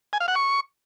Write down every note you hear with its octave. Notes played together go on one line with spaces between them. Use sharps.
G#5
F5
F#5
C#6